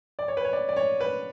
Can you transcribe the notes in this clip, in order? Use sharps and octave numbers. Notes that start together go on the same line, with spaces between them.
D5
C#5
B4
C#5
D5
D5
C#5
B4